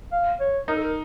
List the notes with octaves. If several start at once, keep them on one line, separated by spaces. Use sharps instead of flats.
F5
C#5
D#4 A#4
A4
A#4